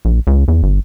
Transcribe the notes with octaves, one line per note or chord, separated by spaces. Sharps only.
A#1
C#2
E2
G1